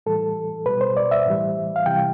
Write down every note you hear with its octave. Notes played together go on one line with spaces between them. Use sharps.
A2 E3 G3 A4
B2 G3 B4
C5
D5
E5
A2 E3 G3
F5
C3 E3 G3 G5